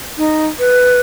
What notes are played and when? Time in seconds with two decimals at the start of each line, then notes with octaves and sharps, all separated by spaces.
0.18 D#4
0.59 B4